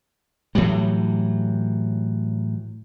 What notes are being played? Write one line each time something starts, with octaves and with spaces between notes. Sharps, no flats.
A2 E3 F#3 G3